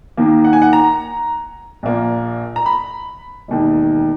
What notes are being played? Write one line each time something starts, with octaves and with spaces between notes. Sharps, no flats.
D#2 D#3 A#3
F#5
G#5
F#5
A#5
A#1 A#2 A#3
A#5
B5
E1 D#2 D#3